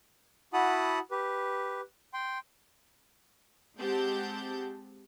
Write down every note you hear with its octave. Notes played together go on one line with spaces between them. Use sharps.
E4 F#4 F#5 A5 B5 D#6
G4 B4
G5 C6
G#3 C4 G4 F#5 A5 G6